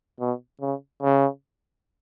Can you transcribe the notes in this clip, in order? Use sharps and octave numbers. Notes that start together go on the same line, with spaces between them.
B2
C#3
C#3